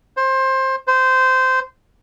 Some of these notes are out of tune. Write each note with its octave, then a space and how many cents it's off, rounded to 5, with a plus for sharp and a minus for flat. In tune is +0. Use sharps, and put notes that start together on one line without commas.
C5 +20
C5 -15